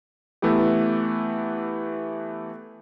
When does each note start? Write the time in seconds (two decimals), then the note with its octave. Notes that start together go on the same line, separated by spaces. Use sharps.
0.42 E3 A3 B3 E4 G4